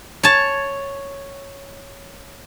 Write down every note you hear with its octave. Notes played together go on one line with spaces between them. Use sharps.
C#5 A5